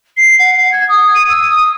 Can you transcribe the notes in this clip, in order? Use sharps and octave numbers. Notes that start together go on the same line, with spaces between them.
C7
F#5
G#6
D#6
D#7
E6
D#6